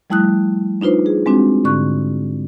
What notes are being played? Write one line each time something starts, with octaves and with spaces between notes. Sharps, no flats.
F3 G3 A3 E4 D#6 F#6
D4 D#4 F4 B4 C5
G#4
G#3 C4 D4 F#4
G#2 D3 C#6 F#6